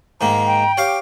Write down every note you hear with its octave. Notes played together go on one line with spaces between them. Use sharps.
G#2 D#3 A#3 A#5
G5
G4 C#5 F5 D6